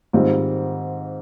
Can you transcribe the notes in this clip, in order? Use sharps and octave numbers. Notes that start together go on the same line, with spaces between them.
G#2 D#3 G3 C4 F4